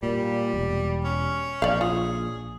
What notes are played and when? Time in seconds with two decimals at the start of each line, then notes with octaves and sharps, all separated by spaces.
0.03 A#2 G3
0.54 E1
1.04 C#4
1.62 A#1 D5 F5
1.81 F4 G#4